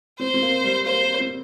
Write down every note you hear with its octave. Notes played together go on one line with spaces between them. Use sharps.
C4 C5
C4
A#3
G3
A#3 C5
A#3
C4